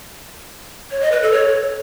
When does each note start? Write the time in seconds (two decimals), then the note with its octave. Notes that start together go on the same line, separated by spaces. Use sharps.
0.91 C#5
1.01 D#5
1.12 B4
1.22 A4
1.32 C#5